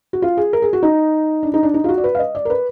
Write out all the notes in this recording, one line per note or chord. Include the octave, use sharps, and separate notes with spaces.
F#4
F4
G#4
A#4
G#4
F#4
D#4
D4
D#4
D4
D#4
F4
F#4
D5
B4
F5
D#5
D5
A#4
B4